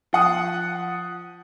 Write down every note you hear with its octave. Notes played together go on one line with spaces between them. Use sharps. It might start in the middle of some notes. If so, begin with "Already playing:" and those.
F3 F#5 D#6